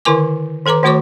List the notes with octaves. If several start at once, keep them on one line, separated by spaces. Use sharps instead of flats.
D3 D#3 E4 A#4 G#5 D6
D#3 A4 B4 A#5 D6
D#3 A3 F#4 C#5 C#6 D6